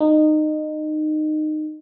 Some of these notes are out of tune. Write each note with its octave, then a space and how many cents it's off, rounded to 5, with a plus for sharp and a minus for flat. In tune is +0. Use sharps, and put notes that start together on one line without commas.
D#4 -20